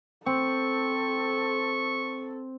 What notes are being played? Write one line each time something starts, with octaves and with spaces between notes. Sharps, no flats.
C4 A4 C#6